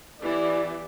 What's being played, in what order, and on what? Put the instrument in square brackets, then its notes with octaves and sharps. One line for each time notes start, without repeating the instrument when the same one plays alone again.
[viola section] E3 B3 G4 [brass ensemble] D5